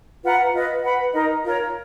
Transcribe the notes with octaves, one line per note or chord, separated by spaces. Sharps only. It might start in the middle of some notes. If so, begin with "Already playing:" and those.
F4 B4 F#5 A#5
F4 B4 D#5 F#5
B4 F#5 B5
D#4 A#4 D#5
F4 A#4 C#5